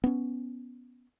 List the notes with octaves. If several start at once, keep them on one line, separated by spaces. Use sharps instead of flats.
B3 C#4